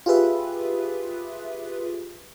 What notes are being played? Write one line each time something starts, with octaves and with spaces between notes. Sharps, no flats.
F4 G4 G#4 B4 E5